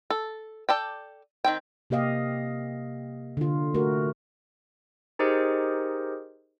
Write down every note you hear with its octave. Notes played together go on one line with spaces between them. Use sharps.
A4
A4 D5 G5
D#3 C4 G5
C3 A#3 G4 D#5 F5
D3 F4
A3 F#4 A#4
D#4 G4 G#4 A#4 C5 D#5